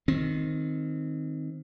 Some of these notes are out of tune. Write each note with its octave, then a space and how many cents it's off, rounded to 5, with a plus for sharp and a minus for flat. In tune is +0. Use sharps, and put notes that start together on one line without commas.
D#3 +0 C4 +0